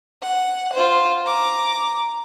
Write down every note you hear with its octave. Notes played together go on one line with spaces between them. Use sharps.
F#5
F4 C5
A#5 D6